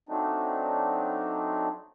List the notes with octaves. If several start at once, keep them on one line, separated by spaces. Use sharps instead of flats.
F#3 A3 C4 D4 D#4